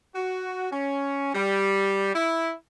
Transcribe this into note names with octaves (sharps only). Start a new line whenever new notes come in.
F#4
C#4
G3
E4